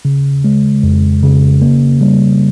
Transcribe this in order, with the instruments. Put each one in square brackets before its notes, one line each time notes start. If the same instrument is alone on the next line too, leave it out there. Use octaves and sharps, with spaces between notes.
[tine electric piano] C#3
G#3
F2
C#3
A#3
G3